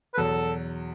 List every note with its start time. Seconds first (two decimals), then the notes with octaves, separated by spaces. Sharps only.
0.14 B4
0.17 E2 B2 F#3 A4